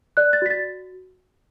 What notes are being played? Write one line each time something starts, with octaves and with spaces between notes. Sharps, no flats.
D5 F#6
A6
F#4 B6
A6